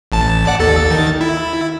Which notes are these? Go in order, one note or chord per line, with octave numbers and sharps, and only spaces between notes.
A1 A5
D5 F#5
D#2 A4 A6
D#3 A6
E4